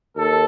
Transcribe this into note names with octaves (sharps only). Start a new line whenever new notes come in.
D#2 A4